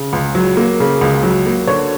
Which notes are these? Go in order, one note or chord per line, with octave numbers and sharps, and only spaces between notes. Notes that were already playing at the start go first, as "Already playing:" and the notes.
Already playing: C#3
C#2
F#3
A#3
C#3
C#2
F#3
A#3
D3 C#5